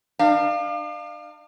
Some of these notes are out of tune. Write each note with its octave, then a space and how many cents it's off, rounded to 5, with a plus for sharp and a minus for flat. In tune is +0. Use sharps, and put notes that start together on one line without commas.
D4 +45 F5 +0